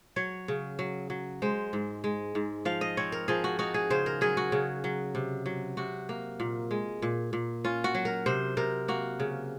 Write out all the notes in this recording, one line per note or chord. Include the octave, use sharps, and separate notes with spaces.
F#3 C#5
C#3
F#3
F#3
G#3 C5
G#2
G#3
G#2
F3 F5
D#5
C4 C#5
A#4
F3 G#4
F#4
D#4 F#4
G#4
C#3 C5
A#4
F#3 G#4
F#4
C#3
F#3
C3
F#3
C3 F#4
A#3
A#2
G#3
A#2
A#2
C#4 F4
F#4
F#3
A#4
C3 C5
C3 A#4
A#3 F#4
C#3